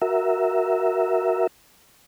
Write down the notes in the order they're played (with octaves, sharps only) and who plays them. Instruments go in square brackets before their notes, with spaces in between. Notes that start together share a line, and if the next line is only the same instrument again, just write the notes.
[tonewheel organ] F#4 A#4 E5